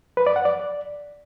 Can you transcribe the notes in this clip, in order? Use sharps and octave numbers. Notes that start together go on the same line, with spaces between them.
B4
D5
F#5
D5